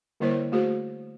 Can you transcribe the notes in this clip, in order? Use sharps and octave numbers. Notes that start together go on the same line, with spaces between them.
D3 G3 A#3 E4 C5 C#5
A3 F#4 G#4 C5